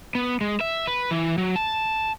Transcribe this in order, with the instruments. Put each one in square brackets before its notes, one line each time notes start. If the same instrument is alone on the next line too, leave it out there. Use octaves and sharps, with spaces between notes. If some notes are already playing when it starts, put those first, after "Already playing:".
[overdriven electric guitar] B3
G#3
E5
B4
E3
F#3
A5